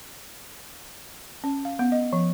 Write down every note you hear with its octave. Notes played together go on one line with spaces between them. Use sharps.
C#4
F5
B3
D#5
F3